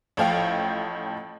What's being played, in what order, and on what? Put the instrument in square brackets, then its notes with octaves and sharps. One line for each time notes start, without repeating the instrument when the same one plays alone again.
[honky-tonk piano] A1 A2 F3 F5 G5